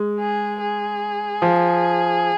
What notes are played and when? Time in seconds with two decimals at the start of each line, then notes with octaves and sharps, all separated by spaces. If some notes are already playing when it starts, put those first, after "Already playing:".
Already playing: G#3
0.19 G#4
0.60 G#4
1.42 F3